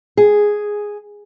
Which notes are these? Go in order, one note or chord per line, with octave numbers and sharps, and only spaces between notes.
G#4